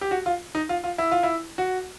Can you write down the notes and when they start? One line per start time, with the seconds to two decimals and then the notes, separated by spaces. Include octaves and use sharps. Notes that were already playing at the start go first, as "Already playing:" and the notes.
0.01 G4
0.11 F#4
0.26 F4
0.55 D#4
0.69 F4
0.84 F4
0.98 E4
1.11 F4
1.23 E4
1.58 F#4